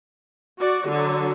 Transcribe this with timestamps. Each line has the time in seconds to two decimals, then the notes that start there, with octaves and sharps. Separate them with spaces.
0.58 F#4 D5
0.88 D3 F#3 F#4